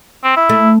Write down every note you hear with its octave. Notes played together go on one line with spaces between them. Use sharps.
C4
E4
A3